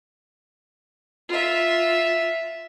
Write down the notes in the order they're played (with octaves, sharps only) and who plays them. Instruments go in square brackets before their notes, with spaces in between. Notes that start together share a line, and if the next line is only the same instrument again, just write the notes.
[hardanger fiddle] F4 E5